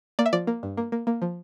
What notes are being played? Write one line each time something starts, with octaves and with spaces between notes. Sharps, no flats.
A#3 D5
E5
F3 D5
A#3
G2
A#3
A#3
A#3
F3